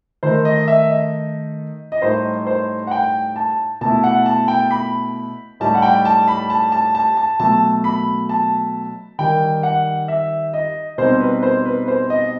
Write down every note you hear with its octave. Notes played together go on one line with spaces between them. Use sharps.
D#3 A3 D#4 C5
D#5
E5
D#5
D#5
A2 G3 D#4 C5
C5
F#5
G5
A5
B2 A3 E4 A5
F#5
A5
G5
B5
A2 G3 D#4 A5
F#5
G5
A5
B5
A5
A5
A5
A5
B2 F#3 A3 A5
B5
A5
D#3 G3 D#4 G5
F#5
E5
D#5
B2 G3 C4 D#4 C5
B4
C5
B4
C5
D#5